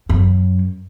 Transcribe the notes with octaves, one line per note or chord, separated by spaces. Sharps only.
F#2